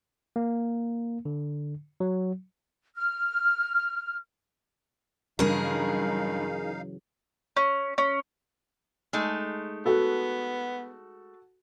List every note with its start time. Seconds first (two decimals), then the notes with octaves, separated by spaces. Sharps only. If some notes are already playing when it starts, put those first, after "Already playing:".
0.36 A#3
1.25 D3
2.00 F#3
2.95 F6
5.39 G2 C#3 E3 F#3 D#4 G#4 A#4 F5
7.57 C#4
7.98 C#4
9.13 G#3 A3 D#4
9.86 B3 F#4 A4